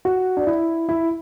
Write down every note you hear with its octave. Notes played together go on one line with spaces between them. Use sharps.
F#4
D4
E4
E4